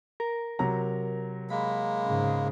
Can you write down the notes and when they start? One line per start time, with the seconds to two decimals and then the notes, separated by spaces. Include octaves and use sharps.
0.20 A#4
0.59 C3 F#3 A#5
1.50 G#3 A#3 B5
2.06 G#2 C#3